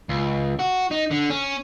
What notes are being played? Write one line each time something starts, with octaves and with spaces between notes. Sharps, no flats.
C#2
F#4
D#4
D3
C#4